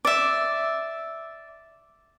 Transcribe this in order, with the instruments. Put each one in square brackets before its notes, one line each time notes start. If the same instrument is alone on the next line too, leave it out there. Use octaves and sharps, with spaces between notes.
[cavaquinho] D5 E5